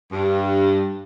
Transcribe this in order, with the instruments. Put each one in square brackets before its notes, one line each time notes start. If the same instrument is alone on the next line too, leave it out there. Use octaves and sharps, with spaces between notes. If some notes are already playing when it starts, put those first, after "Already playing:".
[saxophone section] G2